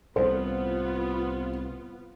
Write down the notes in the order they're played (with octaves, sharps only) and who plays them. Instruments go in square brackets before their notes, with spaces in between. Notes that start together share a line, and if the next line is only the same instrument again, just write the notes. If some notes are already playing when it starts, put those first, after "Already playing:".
[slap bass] C2 A2 [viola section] B3 F4 [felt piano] C5